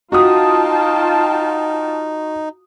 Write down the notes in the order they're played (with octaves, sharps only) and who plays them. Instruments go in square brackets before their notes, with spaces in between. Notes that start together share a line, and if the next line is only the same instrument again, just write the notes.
[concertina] D#4 [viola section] F4 G5 A5 [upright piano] F#4 D#6